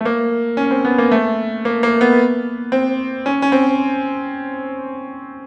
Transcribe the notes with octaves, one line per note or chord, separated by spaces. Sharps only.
A3
A#3
C#4
C4
B3
A#3
A3
A#3
A#3
B3
C4
C#4
C#4
C4